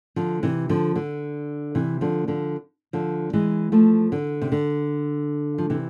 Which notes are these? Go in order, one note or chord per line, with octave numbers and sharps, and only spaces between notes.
D3 F3
C3 E3
D3 F3
D3
C3 E3
D3 F3
D3 F3
D3 F3
E3 G#3
F3 A3
D3
C3
D3
F3
C3 E3